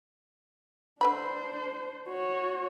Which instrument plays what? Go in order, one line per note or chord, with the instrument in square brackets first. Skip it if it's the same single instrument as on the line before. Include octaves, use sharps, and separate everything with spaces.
[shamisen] D3 B4 B5 [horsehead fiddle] D4 C5
[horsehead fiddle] F#4 C#5